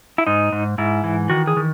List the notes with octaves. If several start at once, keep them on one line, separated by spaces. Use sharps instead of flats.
E4
G#2 D#4
G#2
G#2 E4
E3
D#3 F#4
G#4
D#3